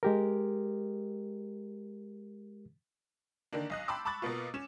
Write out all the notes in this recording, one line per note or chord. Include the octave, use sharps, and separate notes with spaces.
G#3 G4 A#4
D3 D#3 A#3 D4
B1 D#5 F#6
G5 A5 B5 C6 D6 E6
A5 B5 C#6 D6 F#6 A6
B2 A#3 B3 F4
C#4 E7